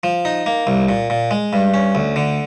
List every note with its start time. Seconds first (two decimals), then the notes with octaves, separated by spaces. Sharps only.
0.03 F3
0.25 D#4
0.46 A#3
0.67 C2
0.89 A#2
1.10 A#2
1.31 G#3
1.53 G2
1.74 C#4
1.95 D2
2.16 D3